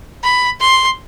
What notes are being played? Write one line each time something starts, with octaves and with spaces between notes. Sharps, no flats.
B5
C6